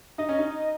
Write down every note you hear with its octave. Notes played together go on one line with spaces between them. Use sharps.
D#4 D#5
C#4
D#4